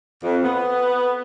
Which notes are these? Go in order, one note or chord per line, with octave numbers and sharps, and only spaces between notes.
F2
B3